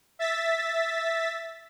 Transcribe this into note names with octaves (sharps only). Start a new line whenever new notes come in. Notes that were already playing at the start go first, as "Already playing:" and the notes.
E5 A6 B6